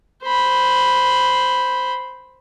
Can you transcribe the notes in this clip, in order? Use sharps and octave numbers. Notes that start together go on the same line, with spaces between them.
C5 B5